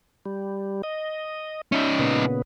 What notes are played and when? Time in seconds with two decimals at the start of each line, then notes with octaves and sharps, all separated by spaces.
0.26 G3
0.83 D#5
1.72 C#4 D#4 E5 G6
1.99 A#2 C#3 B3